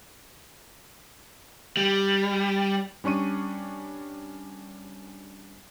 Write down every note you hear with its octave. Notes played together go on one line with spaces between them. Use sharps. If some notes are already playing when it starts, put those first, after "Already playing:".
G3
G3 C#4 D4 C#6 D#7